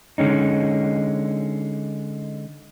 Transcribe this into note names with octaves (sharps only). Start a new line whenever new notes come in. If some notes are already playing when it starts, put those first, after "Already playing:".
D3 G#3 C#4 D#4